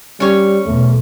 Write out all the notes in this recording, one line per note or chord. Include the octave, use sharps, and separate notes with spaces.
G3 C#4 C#5
B1 E2 A3